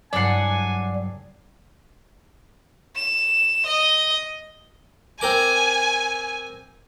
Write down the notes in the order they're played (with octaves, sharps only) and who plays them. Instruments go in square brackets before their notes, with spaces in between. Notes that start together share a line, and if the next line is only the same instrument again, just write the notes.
[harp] F#1 G2 [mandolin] D4 F#5 [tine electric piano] D5 C7 [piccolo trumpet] G#5
[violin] E7
D#5
[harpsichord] C4 A#4 D6 [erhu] G#5